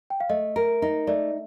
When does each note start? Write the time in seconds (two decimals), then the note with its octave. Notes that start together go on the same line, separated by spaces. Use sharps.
0.10 G5
0.20 F5
0.29 A3 D#5
0.56 A#4
0.82 D#4
1.07 A3 D5